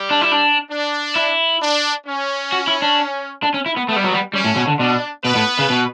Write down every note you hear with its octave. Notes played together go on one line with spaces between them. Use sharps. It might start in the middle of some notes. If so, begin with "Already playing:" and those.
Already playing: G3 G4
D4
E4
D4
D4
E4
D4
C#4
F#4
E4
D4
D4
C#4
E4
B3
A3 B3
G3
F#3
G3
G3 C#4
A2
B2
D3
B2 D4
B2 B3 B4
A2
C#3
B2